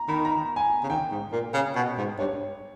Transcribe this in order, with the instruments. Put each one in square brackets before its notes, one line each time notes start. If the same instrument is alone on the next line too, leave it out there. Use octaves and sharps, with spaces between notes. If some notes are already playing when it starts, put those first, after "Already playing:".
Already playing: [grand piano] A#5
[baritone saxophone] D#3 [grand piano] B5
[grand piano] A#5
G#5
[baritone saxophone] C#3
[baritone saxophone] D#3 [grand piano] G5
[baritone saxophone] G#2
A#2
C#3
B2
G#2
[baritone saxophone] G2 [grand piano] C#5